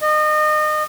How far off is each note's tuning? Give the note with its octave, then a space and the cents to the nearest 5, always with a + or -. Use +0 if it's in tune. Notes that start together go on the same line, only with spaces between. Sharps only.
D#5 -30